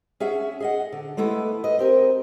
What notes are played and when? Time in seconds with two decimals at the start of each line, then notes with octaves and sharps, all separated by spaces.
0.20 C#4 G#4 E5 F#5
0.60 G#4 D#5 F#5
0.92 D3
1.17 G#3 A3 B3 E4 A4
1.64 B4 D#5
1.79 C4 G4 A#4